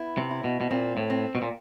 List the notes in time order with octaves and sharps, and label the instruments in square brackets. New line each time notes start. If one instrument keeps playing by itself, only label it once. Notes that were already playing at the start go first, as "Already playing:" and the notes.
Already playing: [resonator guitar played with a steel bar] B3 E4
[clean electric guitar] C3
[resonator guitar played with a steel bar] E4
[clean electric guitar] B2
B2
[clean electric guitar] A#2 [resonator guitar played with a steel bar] C4
[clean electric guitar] A2
[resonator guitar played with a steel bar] C4
[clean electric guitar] B2
A#2